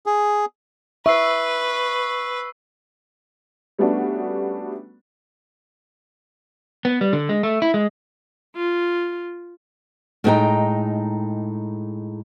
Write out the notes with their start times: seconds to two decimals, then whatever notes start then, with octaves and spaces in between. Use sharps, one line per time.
0.06 G#4
1.06 B4 E5 C#6 E6 C7
3.79 G3 A3 B3 C#4 D4 F#4
6.85 B3
7.01 G3
7.13 D3
7.29 G#3
7.43 A3
7.62 E4
7.74 G#3
8.56 F4
10.24 A2 G#3 B3 D#4 G5 A#5